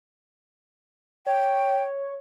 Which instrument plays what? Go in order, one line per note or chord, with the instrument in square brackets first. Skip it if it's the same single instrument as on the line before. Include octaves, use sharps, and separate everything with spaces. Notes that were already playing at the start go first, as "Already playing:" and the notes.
[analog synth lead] C#5 [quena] G5